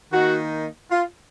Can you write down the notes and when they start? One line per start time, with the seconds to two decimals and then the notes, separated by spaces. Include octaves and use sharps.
0.12 D#3 A#3 D#4 F#4
0.91 F4